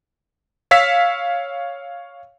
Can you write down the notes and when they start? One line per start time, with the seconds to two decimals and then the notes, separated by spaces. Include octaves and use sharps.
0.71 C#5 F5 E6 B6